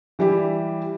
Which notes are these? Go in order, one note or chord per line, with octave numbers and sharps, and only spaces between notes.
E3 G3 E4 G4